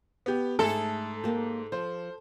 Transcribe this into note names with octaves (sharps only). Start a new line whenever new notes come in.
B3 G4
G#2 A3 G#4 A4
A#3 G4
F3 C5